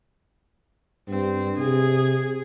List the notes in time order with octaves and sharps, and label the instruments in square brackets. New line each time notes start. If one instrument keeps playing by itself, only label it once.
[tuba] G2 [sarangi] C4
[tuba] C3 [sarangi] G#4